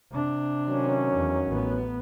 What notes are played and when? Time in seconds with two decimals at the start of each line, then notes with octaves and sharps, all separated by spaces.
0.11 C3 D4
0.68 D#3 F#3 C#4
1.15 E2
1.47 A1 B3